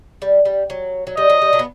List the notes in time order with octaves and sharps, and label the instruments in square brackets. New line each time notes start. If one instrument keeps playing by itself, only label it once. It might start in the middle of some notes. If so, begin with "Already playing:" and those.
[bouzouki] G3
G3
F#3
F#3
[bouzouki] G3 [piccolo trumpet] D#5
[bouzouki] F#3
G3
F#3 A3
B3